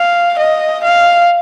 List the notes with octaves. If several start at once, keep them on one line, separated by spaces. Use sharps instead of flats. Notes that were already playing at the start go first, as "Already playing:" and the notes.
Already playing: F5
D#5
F5